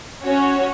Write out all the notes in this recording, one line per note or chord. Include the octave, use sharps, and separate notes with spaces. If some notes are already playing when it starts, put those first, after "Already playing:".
C#4 F#4 C#5